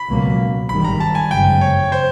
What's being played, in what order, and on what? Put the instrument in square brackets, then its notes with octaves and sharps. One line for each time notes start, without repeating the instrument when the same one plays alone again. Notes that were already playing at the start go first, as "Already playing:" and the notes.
Already playing: [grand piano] B5
[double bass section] C#2 B2 F#3 A#3
[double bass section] G#1 G#2 D#3 G3 [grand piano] B5
[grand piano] A#5
A5
G#5
[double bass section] G1 F#2 C#3 F3 G#3 [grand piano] G5
[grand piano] C#5
C5